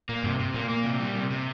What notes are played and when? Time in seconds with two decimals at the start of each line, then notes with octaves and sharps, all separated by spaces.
0.09 A#2 A#3
0.24 G2 C3
0.39 C3
0.54 A#2 A#3
0.69 A#3
0.84 C3
1.00 G3
1.16 C3
1.30 C3